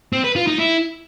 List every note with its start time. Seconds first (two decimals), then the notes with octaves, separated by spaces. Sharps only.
0.13 C4
0.24 B4
0.36 F4
0.47 D#4
0.59 E4